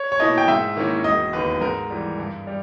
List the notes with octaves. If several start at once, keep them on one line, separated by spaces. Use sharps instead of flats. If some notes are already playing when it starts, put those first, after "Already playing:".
Already playing: C#5
C#5
B2 A#3 E4 D#5
G5
G#2 E5
D#3 A#3 C#4 E4
E1 D#5
D#2 D#3 B4
G#2 A#4
E3 G3
G2
G3